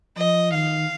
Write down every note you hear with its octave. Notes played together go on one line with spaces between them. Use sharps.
F3 D#5
D#3 F5